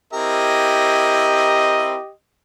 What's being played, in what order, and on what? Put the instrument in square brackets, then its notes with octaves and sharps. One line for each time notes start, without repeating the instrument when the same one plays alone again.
[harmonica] C4 E4 A#4 [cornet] G4 [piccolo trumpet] D#5